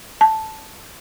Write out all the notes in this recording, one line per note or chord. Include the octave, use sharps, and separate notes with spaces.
A5